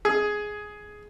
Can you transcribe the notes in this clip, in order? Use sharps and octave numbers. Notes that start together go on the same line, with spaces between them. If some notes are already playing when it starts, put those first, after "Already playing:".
G#4